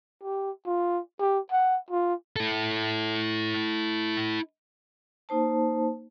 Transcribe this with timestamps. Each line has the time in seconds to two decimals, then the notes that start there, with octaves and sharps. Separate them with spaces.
0.23 G4
0.66 F4
1.20 G4
1.52 F#5
1.91 F4
2.36 E4 A4
5.29 A#3 D#4 C5 A5